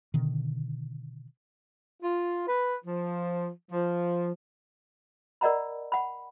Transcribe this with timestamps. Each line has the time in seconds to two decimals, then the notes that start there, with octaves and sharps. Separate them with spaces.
0.14 B2 D3 D#3
2.02 F4
2.47 B4
2.85 F3
3.70 F3
5.41 A#4 D5 D#5 F#5 A#5 B5
5.92 F#5 B5